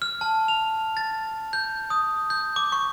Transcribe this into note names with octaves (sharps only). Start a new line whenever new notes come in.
F6
A5
F7
A6
G6
D#6
G6
D6
C#6